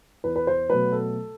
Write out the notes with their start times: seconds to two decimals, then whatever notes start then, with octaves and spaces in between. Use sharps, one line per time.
0.24 E2 B4
0.36 B4
0.47 C5
0.70 B2 F#3 A3 B4
0.92 A4